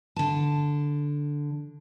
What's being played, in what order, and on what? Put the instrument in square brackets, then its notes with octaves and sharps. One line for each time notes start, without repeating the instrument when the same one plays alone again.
[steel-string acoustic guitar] D3 A5